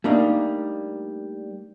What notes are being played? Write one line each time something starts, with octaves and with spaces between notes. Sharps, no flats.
G3 A3 A#3 D4 D#4